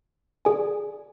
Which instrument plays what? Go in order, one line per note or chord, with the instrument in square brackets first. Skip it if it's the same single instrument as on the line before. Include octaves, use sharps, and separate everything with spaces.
[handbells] G#4 D5 G#5